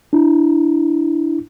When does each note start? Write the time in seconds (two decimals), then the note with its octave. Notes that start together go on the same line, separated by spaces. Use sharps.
0.13 D4 E4